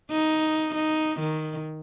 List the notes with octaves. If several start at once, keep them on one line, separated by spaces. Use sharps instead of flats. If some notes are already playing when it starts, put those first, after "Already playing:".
D#4
D#4
D#3